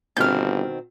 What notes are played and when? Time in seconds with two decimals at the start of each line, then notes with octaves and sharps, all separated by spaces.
0.17 G1 B2 D#3 C4 F6 G6